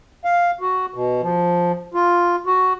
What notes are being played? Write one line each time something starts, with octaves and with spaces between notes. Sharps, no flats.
F5
F#4
B2
F3
F4
F#4